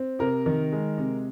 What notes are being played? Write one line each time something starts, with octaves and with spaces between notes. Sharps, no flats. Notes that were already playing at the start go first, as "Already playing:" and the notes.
Already playing: C4
C3 A#4
D#3
G#3
C3